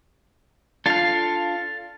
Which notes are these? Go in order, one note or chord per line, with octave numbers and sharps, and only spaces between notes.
D4 F4 A4 F5